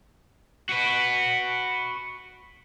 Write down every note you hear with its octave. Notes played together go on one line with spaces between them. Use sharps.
F#4 B4